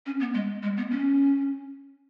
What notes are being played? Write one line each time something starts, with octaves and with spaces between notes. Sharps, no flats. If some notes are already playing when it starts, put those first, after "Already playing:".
C#4
B3
G#3
G#3
B3
C#4